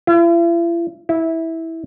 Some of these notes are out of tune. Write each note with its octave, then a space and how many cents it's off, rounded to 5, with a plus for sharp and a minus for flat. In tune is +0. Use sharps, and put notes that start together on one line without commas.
E4 +45
E4 -15